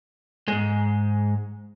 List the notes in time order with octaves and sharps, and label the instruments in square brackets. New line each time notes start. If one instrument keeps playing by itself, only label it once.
[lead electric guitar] G#2 G#3